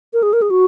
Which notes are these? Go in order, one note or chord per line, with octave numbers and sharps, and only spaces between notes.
A#4
G#4
A#4
G#4
F#4